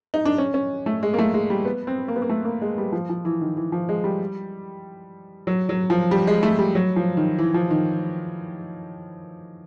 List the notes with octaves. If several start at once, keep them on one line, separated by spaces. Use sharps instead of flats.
D#4
D4
C#4
C#4
A3
G#3
A#3
A3
G#3
G3
B3
C4
A#3
B3
A#3
A3
A#3
G#3
G3
F3
F3
E3
D#3
E3
F3
G#3
G3
F#3
F#3
F3
G3
G#3
A3
G3
F#3
F3
D#3
E3
F3
D#3